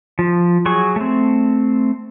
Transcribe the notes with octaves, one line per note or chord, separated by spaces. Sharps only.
F3
F#3 G#4 C#6
A3 C4